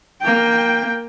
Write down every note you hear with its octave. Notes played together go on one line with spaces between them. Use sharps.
A#3 G5